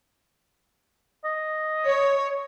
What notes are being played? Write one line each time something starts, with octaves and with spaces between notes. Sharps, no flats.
D#5
C#5